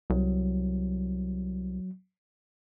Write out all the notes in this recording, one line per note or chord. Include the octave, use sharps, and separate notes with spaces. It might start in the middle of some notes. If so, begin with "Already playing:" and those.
C2 F#3